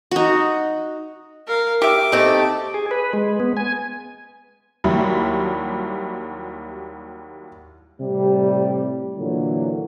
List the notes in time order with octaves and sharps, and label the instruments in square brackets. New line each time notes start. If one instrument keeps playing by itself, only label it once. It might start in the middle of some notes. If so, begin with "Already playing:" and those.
[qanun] D#4 F#4
[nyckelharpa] A#4 F5
[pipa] G4 E5 [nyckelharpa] D6
[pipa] A3 C4 [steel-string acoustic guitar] D#4 G4 A4
[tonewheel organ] G#4
B4
G#3
B3
G#5
[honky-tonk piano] D#2 F#3 G3 E4
[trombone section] A2 C3 G3
A#2 D3 E3 F#3